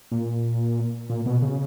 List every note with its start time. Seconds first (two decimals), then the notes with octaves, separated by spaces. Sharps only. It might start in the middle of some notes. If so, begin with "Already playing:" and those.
0.11 A#2
1.10 A#2
1.26 B2
1.42 C#3